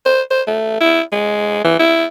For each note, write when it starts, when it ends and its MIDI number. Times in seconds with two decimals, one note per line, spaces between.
0.06 0.21 72
0.31 0.42 72
0.47 0.78 57
0.81 1.02 64
1.12 1.64 56
1.64 1.78 52
1.79 2.06 64